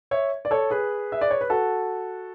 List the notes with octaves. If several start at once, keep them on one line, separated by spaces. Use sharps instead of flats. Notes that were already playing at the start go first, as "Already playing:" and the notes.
C#5 E5
D5
A4 C#5
G#4 B4
E5
D5
C#5
B4
F#4 A4